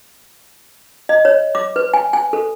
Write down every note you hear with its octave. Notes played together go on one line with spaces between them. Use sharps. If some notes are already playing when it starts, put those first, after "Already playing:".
D#5
C#5
D6
B4
G#5
G#5
A4